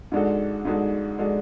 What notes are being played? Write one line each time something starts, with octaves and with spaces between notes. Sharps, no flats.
G#2 G#3 D4 F#4 A4
G#2 G#3 D4 F#4 A4
G#3 D4 F#4 A4